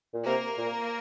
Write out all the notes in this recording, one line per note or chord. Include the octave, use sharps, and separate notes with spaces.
A#2
C3 A#3 A#4
A#2